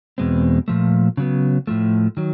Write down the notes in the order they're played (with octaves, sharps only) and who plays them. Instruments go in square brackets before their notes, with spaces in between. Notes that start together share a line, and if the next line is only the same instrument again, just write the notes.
[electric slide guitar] E2 B2 G#3 C4
A#2 F3 A3
C#3 F#3 B3
A2 F3 A3
D#3 F#3